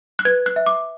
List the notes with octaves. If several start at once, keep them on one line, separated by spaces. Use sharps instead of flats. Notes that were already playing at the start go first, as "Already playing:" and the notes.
F#6
B4 G#6
F#6
E5
D6